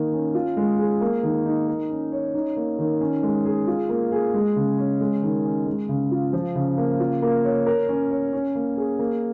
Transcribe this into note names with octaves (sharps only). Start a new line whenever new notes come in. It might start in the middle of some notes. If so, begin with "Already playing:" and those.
Already playing: D#3 A#3
C#4
F4
G#3
G#4
A#3
D#3
D#4
A#4
C#4
C#5
D#4
A#3
D#3
C#4
G#3
G#4
F4
A#3
G#4
G#3
C#3
C#4
G#3
D#3
C#4
G#3
C#3
F4
F3
C#3
A#3
F4
A#3
C#5
A#4
C#4
C#5
C#4
A#3
G#4
A#3